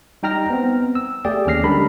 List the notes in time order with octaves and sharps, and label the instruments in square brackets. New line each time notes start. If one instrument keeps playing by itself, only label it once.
[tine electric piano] G3 D#4 G5 A#5 F6 A#6
B3 C4
E6
A3 G4 G#4 D5 G5
D#2 C#4 F6 A#6 C7
D3 G3 G#3 D4 A#4 B5